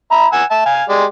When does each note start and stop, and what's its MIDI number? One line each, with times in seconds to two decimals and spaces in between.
0.12 0.26 76
0.12 0.26 82
0.12 0.26 83
0.33 0.44 78
0.33 0.44 80
0.33 0.44 88
0.51 0.63 76
0.51 0.63 81
0.66 0.83 77
0.66 0.83 80
0.89 1.05 56
0.89 1.05 67
0.89 1.05 74